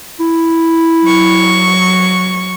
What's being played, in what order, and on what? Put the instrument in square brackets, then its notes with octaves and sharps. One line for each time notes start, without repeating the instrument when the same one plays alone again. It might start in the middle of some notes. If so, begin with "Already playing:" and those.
[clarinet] E4
[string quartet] F#3 C#6